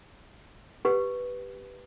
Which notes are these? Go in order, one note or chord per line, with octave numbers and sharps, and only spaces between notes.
G4 B4